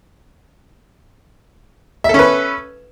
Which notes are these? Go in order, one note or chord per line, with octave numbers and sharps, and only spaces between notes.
C#4 A4 B4 E5